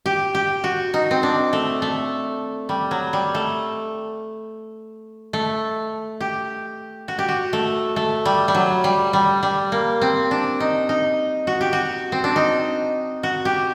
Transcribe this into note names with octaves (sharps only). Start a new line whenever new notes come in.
G4
G4
F#4
D#4
C4
D4
A3
A3
G3
F#3
G3
A3
A3
G4
F#4
G4
F#4
A3
A3
G3
G3
F#3
G3
G3
G3
A#3
C4
D4
D#4
D#4
F#4
G4
F#4
C4
D4
D#4
F#4
G4